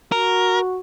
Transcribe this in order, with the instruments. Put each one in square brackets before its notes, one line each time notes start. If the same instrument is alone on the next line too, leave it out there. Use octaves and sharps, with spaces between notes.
[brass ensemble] F#4 [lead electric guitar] A#4